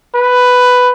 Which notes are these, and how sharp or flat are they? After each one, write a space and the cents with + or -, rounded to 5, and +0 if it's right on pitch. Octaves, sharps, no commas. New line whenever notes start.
B4 +5